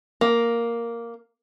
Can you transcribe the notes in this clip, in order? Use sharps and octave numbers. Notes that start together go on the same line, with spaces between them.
A#3